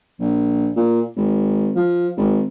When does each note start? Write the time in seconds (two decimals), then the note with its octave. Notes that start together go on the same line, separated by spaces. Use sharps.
0.20 A#1
0.76 A#2
1.16 G#1
1.76 F3
2.17 G#1